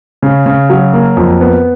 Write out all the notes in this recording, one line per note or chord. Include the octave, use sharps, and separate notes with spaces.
C#3
C#3
F#3
A#3
F2
B3